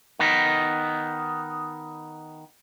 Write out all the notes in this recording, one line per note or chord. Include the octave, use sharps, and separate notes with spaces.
D#3 B3 D#4